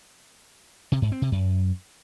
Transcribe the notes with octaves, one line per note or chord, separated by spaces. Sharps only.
C3
G#2
C4
C3
F#2